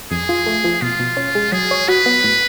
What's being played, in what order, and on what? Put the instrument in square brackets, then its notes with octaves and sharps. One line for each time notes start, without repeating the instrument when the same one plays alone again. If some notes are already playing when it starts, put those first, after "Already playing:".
[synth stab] F2 [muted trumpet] G#4
[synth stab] F4
A3
F3
[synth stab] B2 [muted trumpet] F4
[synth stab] B2
C#4
G#3
[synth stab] F#3 [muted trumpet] G#4
[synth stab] C#5
[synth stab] F#4 [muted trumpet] B4
[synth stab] B3
A2